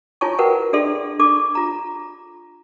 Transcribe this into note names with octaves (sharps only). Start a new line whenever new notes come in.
E4 F4 C#5 G#5 A5 C#6
F#4 A#4 B4 F#5 G5
D4 G#4 A4 D5 E5 C6
D4 A4 C#6 D6
F4 A#5